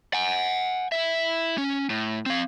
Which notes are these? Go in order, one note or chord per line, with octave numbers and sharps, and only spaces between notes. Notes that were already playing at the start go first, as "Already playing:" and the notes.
F#5 G#5
E4 E5
C#4
A2
C4 F5